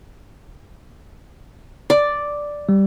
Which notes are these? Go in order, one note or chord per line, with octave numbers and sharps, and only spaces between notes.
D5
G3